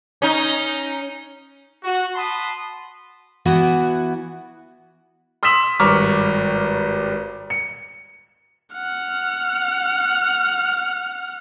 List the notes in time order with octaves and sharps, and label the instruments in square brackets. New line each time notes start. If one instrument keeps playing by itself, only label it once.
[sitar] C#4 D#4
[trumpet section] F#4
F#5 A5 B5 C6 D#6
[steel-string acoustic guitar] E3 B3 E4 F#4
[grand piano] C6 D#6 E6 B6 E7 F#7
G#1 G2 A#5 C#6 D6 F6
C#7
[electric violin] F#5 F6